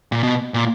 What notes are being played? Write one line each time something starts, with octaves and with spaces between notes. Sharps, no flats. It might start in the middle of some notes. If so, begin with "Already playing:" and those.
A#2
B2
A#2